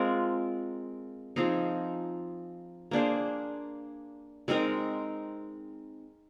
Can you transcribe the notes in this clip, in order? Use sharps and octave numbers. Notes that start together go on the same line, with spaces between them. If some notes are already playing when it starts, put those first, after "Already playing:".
Already playing: G#3 C4 F4 A#4
F3 C4 D#4 G#4
A#3 D4 G#4 C5
G#3 C4 D#4 A#4